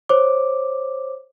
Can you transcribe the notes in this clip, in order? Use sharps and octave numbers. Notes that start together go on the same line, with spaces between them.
C5 C#5 D6